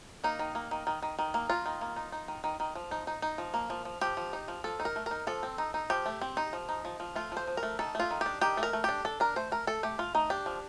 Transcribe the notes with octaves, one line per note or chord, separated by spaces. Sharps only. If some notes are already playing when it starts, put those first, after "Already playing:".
A#3 D#4
D#3
A#3
D#3
D#3
D#3
D#3
A#3
A#3 F4
D#3
A#3
D#4
D#4
D#3
D#3
D#3
F3
D#4
D#4
D#4
F3
A#3
F3
F3
F3 G4
F3
D#4
F3
F3 A4
D#4
A#4
A3
D#4 A#4
F3 A4
C4
D#4
D#4
F3 G4
A3
C4
D#4
F3
D#4
F3
F3
A3 F4
F3 C5
F3
A#4
A3
D#3 A4
A3 F4
D#3
D4 G4
D#3 G4
A3
A#4
A3
D4 G4
D4 A4
D4 A#4
A3 C5
A3 A#4
A3 A4
A3 G4
A3 F4
A3 D#4
D4 G4
F3